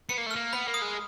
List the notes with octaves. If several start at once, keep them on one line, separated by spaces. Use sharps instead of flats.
B3 C#7
A#3
A3
F6
A#3
B3 B5
A#3
D#6
G#3